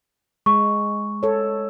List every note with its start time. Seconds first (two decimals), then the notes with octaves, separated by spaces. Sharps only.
0.46 G#3 C#6
1.23 A4 C#5